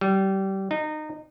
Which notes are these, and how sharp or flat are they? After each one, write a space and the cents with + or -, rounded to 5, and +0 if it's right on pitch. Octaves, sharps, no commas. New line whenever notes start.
G3 -25
D#4 -25